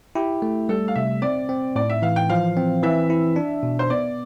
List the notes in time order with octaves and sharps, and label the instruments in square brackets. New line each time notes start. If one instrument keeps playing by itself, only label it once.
[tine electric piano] E4 [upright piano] G4
[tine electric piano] A3
[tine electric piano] G3 [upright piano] A4
[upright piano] F5
[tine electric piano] C3 [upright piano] E5
[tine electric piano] C4 [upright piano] D5
[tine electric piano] C4
[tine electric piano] A2 [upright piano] D5
[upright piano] E5
[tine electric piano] E3 [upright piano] F5
[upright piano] G5
[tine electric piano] F3 [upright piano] F5
[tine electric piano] C4
[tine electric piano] E3 [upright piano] E5
[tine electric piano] E4
D4
B2
[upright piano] C5
[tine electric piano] B3 [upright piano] D5